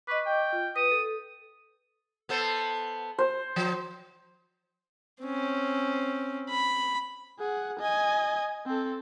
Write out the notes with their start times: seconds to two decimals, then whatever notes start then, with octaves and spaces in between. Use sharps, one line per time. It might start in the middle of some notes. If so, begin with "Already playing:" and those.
0.07 B4 D#5 C#6 D6
0.26 G5
0.53 F4
0.76 B4 D#6
0.91 A4
2.29 B3 A4 C5
3.18 C5
3.56 F3
5.23 C4 C#4
6.50 B5
7.40 G#4 F#5
7.79 D#5 G#5
8.66 C4 A4